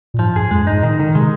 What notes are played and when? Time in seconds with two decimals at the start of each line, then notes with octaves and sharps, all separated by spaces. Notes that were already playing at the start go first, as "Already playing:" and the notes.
0.14 A#2
0.19 G#2 F3
0.35 G2 G#4
0.51 F2 G#3
0.62 G2
0.67 D#4
0.73 G#2
0.83 A#2 D#3
0.99 D3 D#3
1.15 C3 G#3